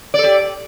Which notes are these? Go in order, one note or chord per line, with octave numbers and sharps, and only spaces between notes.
G4 A4 D5